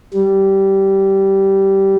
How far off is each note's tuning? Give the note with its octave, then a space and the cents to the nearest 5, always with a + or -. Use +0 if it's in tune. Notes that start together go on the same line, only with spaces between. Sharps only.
G3 -15